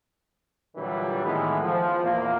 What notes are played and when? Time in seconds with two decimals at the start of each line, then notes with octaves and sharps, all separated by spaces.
0.75 A#2 D3 E3 F#3 G3
1.24 A2 D#3 E3 G#3 B3
1.62 F3
2.03 E2 A#2 A#3